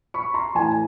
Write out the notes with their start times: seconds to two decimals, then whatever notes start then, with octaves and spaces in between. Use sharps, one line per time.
0.14 B5 C#6
0.34 A#5 C6
0.55 A2 E3 G#5 A#5